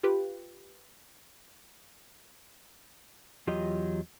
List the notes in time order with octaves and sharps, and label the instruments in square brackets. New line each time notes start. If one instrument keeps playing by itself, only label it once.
[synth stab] F4 G4 B4
[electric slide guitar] E2 F#3 F4 G4 D#5